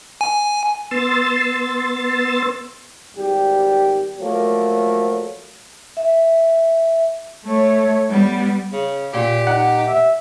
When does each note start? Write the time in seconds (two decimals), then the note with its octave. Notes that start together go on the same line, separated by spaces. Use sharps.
0.21 G#5
0.91 B3 C6 E6 A6
3.15 G#1 G3 G4
4.18 F3 F#3 A3 A#3
5.97 E5
7.45 A3 C#5
8.10 G3 B3
8.73 C#3
9.13 A#2 G4
9.47 D#4 F#5
9.87 E5